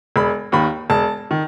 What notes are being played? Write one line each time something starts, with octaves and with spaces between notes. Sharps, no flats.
E1 B5
D#2 D#3 B5
E1 A5
D#3